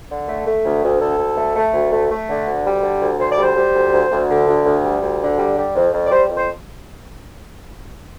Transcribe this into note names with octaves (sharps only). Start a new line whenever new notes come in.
D3
A3
A3
D2
D2
D2 A4
D2
A3
A3
D2
A3
A3
D3
D2
G3
D3
D2
D2 C5
D5
G3
C5
G3
D2
D2
D2
D3
D2
D2
G3
D2
D3
G3
G3
F2
F2
D5
G3 C5
F2
C5